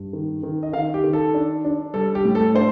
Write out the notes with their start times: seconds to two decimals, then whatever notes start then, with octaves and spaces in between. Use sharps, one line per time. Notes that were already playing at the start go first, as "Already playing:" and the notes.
Already playing: G2
0.13 D#3
0.43 D#3
0.63 D#5
0.73 D#3 F5
0.94 G4
1.04 D#3
1.13 A4
1.34 D4
1.65 D4
1.94 G3 A4
2.15 G4
2.25 A2
2.35 A4
2.54 D4 C5